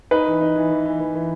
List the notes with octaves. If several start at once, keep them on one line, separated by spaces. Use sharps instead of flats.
D#4 B4
E3
D#4
E3
E3
E3
E3
E3